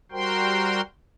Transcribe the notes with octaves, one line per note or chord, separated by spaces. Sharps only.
G3 F#4 A#4 C5 G5 C6